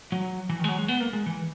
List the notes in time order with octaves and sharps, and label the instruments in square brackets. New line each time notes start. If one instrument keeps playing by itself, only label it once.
[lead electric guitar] F#3
E3
D#3
G#3
F#3
G#3
B3
A#3
G#3
E3